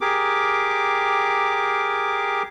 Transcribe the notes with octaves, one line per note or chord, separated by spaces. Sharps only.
G4 G#4 A#4 D6